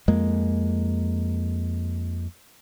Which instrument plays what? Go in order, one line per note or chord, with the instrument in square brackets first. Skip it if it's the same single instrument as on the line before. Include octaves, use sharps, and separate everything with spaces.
[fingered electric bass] F2 G#3 A#3